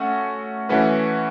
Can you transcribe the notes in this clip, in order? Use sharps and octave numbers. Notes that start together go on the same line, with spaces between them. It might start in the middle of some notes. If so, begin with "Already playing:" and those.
Already playing: A3 C#4 F#4
E3 A3 C#4 F#4 B4